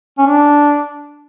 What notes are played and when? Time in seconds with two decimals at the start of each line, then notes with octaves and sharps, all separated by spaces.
0.19 C#4
0.26 D4